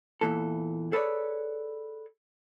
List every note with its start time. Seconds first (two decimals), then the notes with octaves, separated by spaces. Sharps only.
0.21 E2 G2 A#2 E3 A4
0.92 G#4 A4 B4 C#5 D5